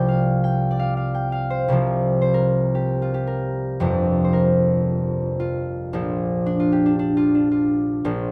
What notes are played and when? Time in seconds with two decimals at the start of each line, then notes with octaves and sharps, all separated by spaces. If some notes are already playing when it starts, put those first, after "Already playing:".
Already playing: C2 C3 F3 D5 G5
0.08 F5
0.44 G5
0.71 D5
0.79 F5
0.97 F5
1.15 G5
1.32 F5
1.50 C5
1.68 C2 C3 F3
2.22 C5
2.34 A#4
2.75 G4
3.02 F4
3.14 G4
3.27 A#4
3.80 G1 F2 C3 F3
4.24 C5
4.33 A#4
5.40 F4
5.93 A#1 A#2 F3
6.46 D4
6.60 F4
6.72 G4
6.86 D4
6.99 D4
7.17 F4
7.35 D4
7.51 F4
8.05 A#1 A#2 F3